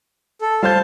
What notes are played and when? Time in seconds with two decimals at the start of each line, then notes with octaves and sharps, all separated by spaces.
0.41 A4
0.63 G3 C5 F5 A5 G6